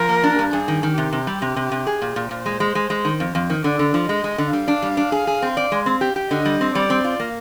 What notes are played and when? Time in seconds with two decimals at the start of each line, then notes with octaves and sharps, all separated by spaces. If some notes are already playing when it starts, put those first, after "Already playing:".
Already playing: F3 A#4
0.09 A#3
0.24 D4
0.39 G2
0.53 G2 G#4
0.68 D#3
0.83 D#3
0.97 C3 G4
1.13 C3
1.27 G3
1.42 C3
1.56 C3
1.71 C3
1.87 G#4
2.02 A#2
2.16 A#2
2.30 A#2 C5
2.46 G#3
2.60 G#3
2.75 G#3
2.90 G#3
3.05 D#3
3.20 F2
3.35 F2
3.50 D#3
3.64 D3 D5
3.79 D3
3.94 F3
4.08 G#3 D#5
4.24 G#3
4.38 D3
4.53 G3 F5
4.68 D4
4.82 G3
4.97 D4
5.12 G#4
5.27 G#4
5.42 C4
5.57 D5
5.72 G#3
5.86 C4
6.01 G4
6.16 G4
6.31 D3 D#5
6.45 G3
6.61 C4
6.75 G3 D5
6.90 C4
7.04 F4
7.20 A#3